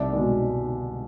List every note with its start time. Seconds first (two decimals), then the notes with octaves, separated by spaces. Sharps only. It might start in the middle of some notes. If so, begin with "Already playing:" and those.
Already playing: C2 D5 E5
0.13 B2 G#3